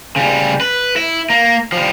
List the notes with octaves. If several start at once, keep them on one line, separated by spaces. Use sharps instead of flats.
C#3 G3
B4
E4
A#3
F3 G3